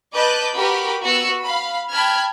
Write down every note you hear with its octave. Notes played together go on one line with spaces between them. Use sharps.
B4 D#5 A5 D6 F#6 G6
F#4 G4 A#4 B4 B5 D6
B3 F#4 E6
F5 B5
G5 A5 B5 F6 G#6